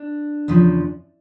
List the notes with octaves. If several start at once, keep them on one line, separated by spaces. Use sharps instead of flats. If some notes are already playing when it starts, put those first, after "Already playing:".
Already playing: D4
E2 C#3 F3